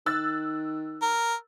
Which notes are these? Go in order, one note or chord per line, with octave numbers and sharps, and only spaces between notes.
D#3 E6 F#6 A6
A#4